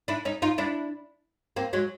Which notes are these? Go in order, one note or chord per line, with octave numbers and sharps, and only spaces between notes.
D4 E4
C#4 D#4
D#4 F4
D4 E4
A#3 C4
F#3 G#3